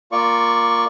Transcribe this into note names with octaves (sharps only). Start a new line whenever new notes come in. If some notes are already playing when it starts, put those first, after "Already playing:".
A#3 F4 D5 C#6